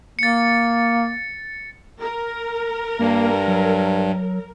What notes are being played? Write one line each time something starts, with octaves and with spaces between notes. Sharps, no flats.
A#3 A6 C#7
A#4
G2 A#3
F#3